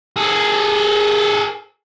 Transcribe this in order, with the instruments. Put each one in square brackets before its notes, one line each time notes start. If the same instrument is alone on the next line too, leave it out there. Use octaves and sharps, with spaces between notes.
[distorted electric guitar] G#4 A4